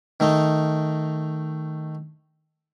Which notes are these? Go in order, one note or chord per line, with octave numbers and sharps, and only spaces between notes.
D#3 A3 D#4